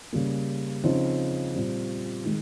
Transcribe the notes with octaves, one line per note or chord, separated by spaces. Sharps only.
C#3 G3 A#3
C#3 F3 C4 D#4
A#2 G3 C4
D#3 G#3